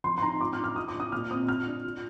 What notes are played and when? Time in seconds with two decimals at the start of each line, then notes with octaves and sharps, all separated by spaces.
0.04 F3 C6
0.18 C6
0.22 D#4 A#5
0.40 F4 D6
0.53 F6
0.58 D4
0.64 F6
0.76 F4 D#6
0.88 D6
0.94 D4
1.00 D#6
1.12 A#2 F6
1.31 C4 D#6
1.48 F4 F6
1.66 D4
1.84 F4